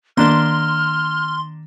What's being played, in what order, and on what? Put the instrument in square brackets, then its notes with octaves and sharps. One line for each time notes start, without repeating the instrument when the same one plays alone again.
[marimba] D#3 [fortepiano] A#3 D4 [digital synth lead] C6 [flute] F6